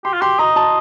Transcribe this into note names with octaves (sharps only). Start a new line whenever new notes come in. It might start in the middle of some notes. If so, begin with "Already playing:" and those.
G4 C6
F4
G4 C6
D#5 A#5
A5